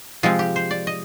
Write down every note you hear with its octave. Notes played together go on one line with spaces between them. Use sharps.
C3 F3 G#3 C4 F4
G4
C5
D5
D#5